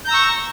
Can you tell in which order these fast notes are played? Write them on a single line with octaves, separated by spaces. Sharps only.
G6 A#5 E6 C#6